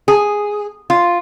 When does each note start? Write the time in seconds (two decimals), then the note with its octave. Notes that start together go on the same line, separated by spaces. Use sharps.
0.08 G#4
0.90 F4